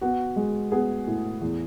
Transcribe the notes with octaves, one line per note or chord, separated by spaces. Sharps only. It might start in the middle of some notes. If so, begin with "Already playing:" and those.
B3 F#4
G#3
B3 G#4
A2
E2